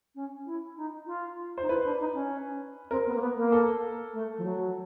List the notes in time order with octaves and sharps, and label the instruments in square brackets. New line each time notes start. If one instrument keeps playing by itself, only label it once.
[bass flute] C#4
E4
D#4
F4
[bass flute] D#4 [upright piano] C5
[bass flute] E4 [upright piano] B4
[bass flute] D4
D#4
C#4
[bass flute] C4 [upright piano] A#4
[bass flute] B3
A#3
B3
A#3
[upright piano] A4
[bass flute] A3
F3
F#3